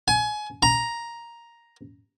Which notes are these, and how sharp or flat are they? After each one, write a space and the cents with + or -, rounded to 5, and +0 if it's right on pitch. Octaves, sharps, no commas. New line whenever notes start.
G#5 +25
A#5 +5